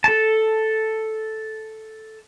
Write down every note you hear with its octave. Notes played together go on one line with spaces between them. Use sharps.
A4 A5